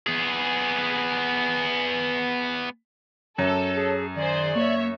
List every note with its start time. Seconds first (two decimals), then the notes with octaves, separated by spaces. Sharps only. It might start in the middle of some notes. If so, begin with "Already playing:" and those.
0.07 B3 G#4
3.38 F#2 A4 C#5
3.75 G#4
4.15 D#3 G#4 C5 D5
4.55 A#3 C#5 E5